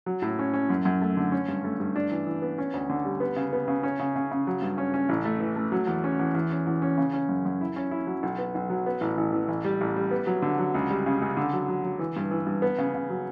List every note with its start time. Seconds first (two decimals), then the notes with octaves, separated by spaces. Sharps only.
0.06 F#3
0.22 A2
0.39 C#4
0.54 C#4
0.70 F#2
0.85 F#2
1.02 A3
1.17 D3
1.32 C#4
1.48 G2
1.64 A3
1.80 G2
1.96 D4
2.11 E3
2.27 E3
2.42 B3
2.58 C#4
2.74 D2
2.89 D3
3.05 G3
3.20 B3
3.36 C#3
3.53 B3
3.68 C#3
3.83 C#4
4.00 C#3
4.16 C#3
4.31 C#3
4.47 F#3
4.62 G2
4.78 C#4
4.94 C#4
5.09 A1
5.25 A3
5.40 E3
5.56 A3
5.72 F#3
5.87 E2
6.04 C#4
6.19 E2
6.35 E2
6.51 C#4
6.67 E2
6.82 C#4
6.97 C#3
7.13 C#4
7.29 F#2
7.45 F#2
7.61 E4
7.76 C#4
7.91 E4
8.07 F#3
8.23 B1
8.39 B3
8.55 B1
8.70 F#3
8.86 B3
9.01 A1
9.17 A1
9.33 E3
9.48 A1
9.65 G3
9.81 A1
9.96 G3
10.11 B3
10.27 F#3
10.42 D3
10.58 F#3
10.74 C#2
10.91 G3
11.06 C#3
11.21 C#2
11.37 D3
11.53 F#3
11.68 F#3
11.84 F#3
11.99 E3
12.16 G2
12.31 E3
12.46 G2
12.62 B3
12.78 C#3
12.95 C#3
13.10 F#3